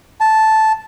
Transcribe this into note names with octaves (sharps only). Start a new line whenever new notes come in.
A5